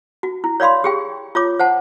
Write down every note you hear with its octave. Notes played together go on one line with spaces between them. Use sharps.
F#4
E4
C#5 D5 F5 B5 C6
G4 G#4 G5
F4 C#5 D6
C5 F#5 A5